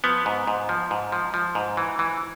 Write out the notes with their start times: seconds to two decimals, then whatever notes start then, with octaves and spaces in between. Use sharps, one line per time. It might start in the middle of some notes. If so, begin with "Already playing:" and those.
0.04 F3 B3
0.26 G#2
0.47 G#2
0.69 F3
0.91 G#2
1.12 F3
1.34 F3
1.55 G#2
1.77 E3
1.99 E3